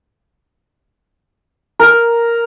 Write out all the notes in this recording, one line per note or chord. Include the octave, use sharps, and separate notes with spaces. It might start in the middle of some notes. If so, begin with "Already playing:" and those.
A#4